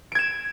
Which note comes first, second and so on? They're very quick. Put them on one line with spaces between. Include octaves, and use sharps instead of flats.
D7 G#6 E7